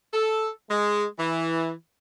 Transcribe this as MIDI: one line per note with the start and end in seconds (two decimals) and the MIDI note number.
0.14 0.50 69
0.69 1.05 56
1.19 1.71 52